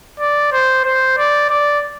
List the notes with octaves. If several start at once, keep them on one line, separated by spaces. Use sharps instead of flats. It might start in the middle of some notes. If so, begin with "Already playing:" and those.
D5
C5
C5
D5
D5